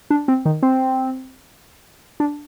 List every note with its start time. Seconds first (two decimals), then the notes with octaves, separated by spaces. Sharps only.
0.10 D4
0.28 C4
0.45 D#3
0.63 C4
2.20 D4